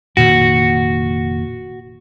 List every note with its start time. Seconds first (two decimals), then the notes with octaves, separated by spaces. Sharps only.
0.17 F1 A#2 D#3 F#4